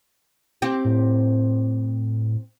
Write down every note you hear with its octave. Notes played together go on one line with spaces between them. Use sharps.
C4 G4
A2